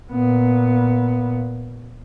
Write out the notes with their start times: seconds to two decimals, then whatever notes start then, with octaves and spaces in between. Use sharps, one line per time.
0.11 A#2 B3